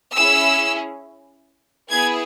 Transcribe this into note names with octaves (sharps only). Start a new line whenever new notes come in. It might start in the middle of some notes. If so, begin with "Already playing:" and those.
C#4 E4 G#4 E6
B3 E4 G#4 G#6